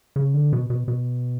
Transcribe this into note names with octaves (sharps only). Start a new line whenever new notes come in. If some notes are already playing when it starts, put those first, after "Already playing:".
C#3
D3
B2
B2
B2